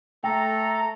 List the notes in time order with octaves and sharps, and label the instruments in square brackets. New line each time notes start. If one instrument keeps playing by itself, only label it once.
[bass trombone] A3 [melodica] A4 [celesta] G5 [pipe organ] A#5